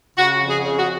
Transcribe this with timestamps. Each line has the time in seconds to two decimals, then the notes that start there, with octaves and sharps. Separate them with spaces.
0.18 C#3 F#4
0.41 F2
0.49 G#4
0.63 C#3
0.79 F#4